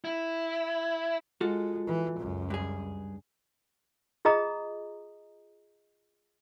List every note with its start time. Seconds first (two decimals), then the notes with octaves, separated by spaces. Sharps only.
0.04 E4
1.41 G#3 F4 F#4 A4
1.87 E3
2.19 C#2 F#2
2.50 G2 G#4
4.25 F4 G#4 D#5 A#5 D#6